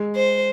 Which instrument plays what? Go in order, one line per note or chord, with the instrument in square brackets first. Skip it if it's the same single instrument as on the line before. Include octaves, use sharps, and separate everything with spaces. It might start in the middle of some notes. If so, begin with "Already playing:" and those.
Already playing: [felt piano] G#3
[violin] C5